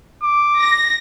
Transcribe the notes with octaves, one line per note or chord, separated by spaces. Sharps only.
D6
A#6